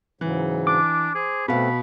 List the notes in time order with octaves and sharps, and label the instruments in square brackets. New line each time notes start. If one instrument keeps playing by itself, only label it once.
[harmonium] G#2 C#3 F#3 [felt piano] E3
[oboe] D4 [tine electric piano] D6
[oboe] G#4 [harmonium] C5
[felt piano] B2 F5 [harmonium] A3 C4 B4 [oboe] B5